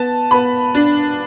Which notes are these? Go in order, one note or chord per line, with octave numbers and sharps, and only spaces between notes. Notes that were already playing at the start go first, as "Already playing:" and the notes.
Already playing: B3 A5
B3 B5
D4